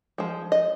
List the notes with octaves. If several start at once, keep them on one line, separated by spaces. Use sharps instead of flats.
F3 G#3
D#5